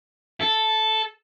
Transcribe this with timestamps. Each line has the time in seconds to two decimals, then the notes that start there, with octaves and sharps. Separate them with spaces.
0.41 A4